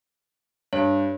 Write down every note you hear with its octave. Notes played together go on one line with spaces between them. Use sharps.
G2 C#5